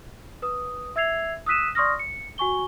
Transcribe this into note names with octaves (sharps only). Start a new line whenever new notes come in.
B4 D#6
E5 E6 G#6 C7 F7
D#6 E6 F#6 B6 D#7 E7
D5 C6 C#6 D#6 F6 A#6
C#7
F#4 G#5 C#6 G7